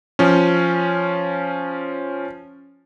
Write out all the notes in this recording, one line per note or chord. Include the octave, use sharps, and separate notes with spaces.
F3 C#4